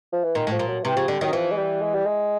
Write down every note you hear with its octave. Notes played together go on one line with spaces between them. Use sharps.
F3
E3
A#2 D#3
A2 F3
A#2
F#3
C3 E3
C#3 F3
D3 G3
D#3 F#3
E3 F3
G#3
G3
G#3
G3
G#3